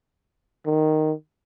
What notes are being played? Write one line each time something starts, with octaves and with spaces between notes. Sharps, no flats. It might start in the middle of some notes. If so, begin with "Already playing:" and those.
D#3